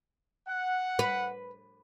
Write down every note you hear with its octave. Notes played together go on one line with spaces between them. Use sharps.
F#5
B4